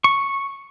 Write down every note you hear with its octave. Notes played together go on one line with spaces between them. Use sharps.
C#6